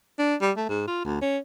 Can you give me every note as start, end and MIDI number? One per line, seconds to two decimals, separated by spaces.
0.19 0.35 62
0.41 0.51 55
0.56 0.64 57
0.69 0.84 44
0.87 1.04 65
1.05 1.17 38
1.22 1.38 61